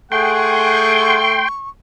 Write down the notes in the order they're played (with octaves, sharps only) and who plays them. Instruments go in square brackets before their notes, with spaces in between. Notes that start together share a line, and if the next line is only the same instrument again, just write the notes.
[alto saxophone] A3 [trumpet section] G#4 F#5 [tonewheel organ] G5 C6 [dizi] C#6